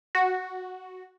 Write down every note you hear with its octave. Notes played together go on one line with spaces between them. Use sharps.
F#4